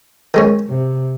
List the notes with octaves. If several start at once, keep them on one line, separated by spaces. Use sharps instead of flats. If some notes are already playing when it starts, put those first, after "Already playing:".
D#3 G#3 C#4
C3